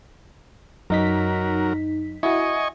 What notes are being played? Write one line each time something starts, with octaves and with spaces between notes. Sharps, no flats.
F#2 F#3 D#4 A#4 B6
E4 F#4 D#5 G#5 C#6